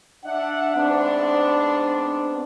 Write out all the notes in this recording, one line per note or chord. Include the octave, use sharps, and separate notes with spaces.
D4 E5 F#5
G#2 B3 C4 D4